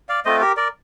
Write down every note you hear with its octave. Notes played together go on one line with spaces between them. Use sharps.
D5 F5
A3 C4 F4 C5 D#5
G4 A#4
A#4 D5